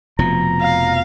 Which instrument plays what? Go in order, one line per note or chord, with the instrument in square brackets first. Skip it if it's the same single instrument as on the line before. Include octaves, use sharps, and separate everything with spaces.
[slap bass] F1 B2 F3 [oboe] A#5
[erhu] F5